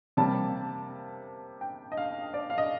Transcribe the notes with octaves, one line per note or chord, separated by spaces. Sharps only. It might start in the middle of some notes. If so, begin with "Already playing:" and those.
C3 G3 A#3 A5
G5
D#5
F5
D5
F5
D#5